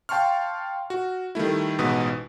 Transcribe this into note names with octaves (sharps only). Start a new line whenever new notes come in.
F5 G5 A5 C6 C#6 F6
F#4
D#3 G3 A3 E4
A1 G#2 B2 F#4 B4 D#6